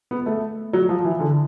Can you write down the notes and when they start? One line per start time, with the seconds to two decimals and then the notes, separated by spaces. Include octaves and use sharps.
0.11 B3
0.26 A3
0.73 F#3
0.89 F3
1.05 E3
1.20 D3